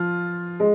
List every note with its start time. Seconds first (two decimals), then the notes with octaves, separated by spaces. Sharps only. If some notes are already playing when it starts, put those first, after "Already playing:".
Already playing: F3 F4
0.60 G#3